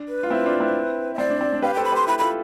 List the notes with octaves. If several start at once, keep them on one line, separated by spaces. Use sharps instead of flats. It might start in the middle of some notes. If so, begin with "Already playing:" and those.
Already playing: D4
B4
F4
C4 E4
D4 F4
C4 E4
E5
C4 D5
D4
C4
D4
G4 B4 F5
A4 C5 G5
B5
G4 B4 C6
E4 G4 B5
F4 A4 B5